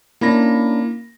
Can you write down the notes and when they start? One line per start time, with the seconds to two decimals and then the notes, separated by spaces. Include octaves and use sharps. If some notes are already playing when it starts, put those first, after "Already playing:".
0.21 A#3 C#4 D4 E4 B5 A#6